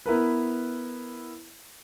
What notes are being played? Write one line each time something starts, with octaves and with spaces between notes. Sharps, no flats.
B3 E4 A#4 B4